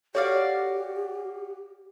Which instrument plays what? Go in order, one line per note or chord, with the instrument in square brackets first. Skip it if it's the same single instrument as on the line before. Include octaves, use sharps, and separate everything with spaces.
[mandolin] F#4 D5 F5 [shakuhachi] G4 [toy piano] A4 C#5